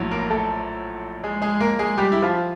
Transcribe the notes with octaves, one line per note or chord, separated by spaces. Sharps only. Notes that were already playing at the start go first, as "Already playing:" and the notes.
Already playing: A#1 A2 F#3
A#3 A#4
A3 A4
G#3 G#4
G#3 G#4
A#3 A#4
G#3 G#4
G3 G4
E4
F3 F4